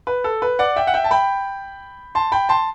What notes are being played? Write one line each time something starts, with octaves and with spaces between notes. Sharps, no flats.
B4
A4
B4
D5 F#5
E5 G5
F#5
E5 G5
A5
G5 B5
A5 C6
G5 B5
A5 C6